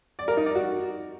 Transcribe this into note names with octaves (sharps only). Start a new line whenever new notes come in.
D5
A#4
D#4
D5
F#4